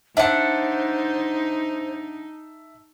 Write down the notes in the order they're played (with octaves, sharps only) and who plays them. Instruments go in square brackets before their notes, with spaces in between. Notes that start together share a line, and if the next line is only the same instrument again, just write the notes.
[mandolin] D4 F#5 [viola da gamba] D#4 [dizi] C5 [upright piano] E5 A5